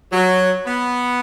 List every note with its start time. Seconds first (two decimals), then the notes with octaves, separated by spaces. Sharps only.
0.12 F#3
0.66 B3